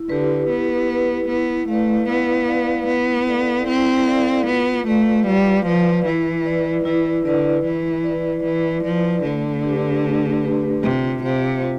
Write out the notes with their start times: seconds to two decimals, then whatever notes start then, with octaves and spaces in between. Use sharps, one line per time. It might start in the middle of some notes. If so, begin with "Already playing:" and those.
Already playing: E4
0.09 D3 G4 B4
0.49 B3 E4
0.90 G4 B4
1.28 B3 E4
1.68 A3 B4 D5 F5
2.09 B3 E4
2.47 B4 D5 F5
2.87 B3 E4
3.27 A4 D5 F5
3.67 C4 E4
4.07 A4 D5 F5
4.47 B3 F4
4.86 A3 B4 D5 F5
5.26 G3 F4
5.65 F3 B4 D5 F5
6.06 E3 E4
6.46 B4 D5
6.85 E3 E4
7.25 D3 B4 D5
7.64 E3 E4
8.04 B4 D5
8.44 E3 E4
8.84 F3 B4 D5
9.23 D3 A3
9.63 D4 G4 B4
10.04 A3
10.43 D4 G4 B4
10.82 C3 F4
11.23 C3 C5 F5
11.63 F4